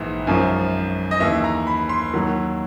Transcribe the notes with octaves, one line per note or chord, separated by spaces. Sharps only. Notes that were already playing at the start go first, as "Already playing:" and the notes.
Already playing: A#1 G#2 E3
G#1 F#2 C#3 F3
D#5
D#2 C#3 E3 E5
A#5
B5
C6
D#2 D#3 F#3